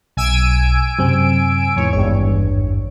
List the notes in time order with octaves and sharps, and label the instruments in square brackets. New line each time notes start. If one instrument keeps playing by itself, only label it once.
[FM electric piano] B1 [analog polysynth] G#5 E6 D7
[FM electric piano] F#2 C3 C4
[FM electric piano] E2 G#2 E3 [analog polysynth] C#5
[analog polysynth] G#1 E2 G2 [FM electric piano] C#5